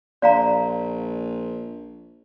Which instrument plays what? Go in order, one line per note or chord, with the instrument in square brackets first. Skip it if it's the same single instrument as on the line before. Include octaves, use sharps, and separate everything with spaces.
[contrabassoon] A#1 [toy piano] D5 F5 A#5